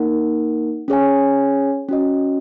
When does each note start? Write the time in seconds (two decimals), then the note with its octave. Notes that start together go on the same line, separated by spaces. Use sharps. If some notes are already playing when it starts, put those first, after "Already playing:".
Already playing: A#3 D#4 A#4 F#5
0.88 C#4 G#4 C#5 G#5
1.89 C#4 F#4 D#5